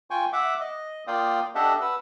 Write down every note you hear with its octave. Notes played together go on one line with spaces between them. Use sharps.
F4 G5 G#5 C#6
E5 F#5 D6
D#5
A#3 F4 D5 F5 G5 D#6
D4 G4 A4 D#5 E5 F#5
B4 F#5 E6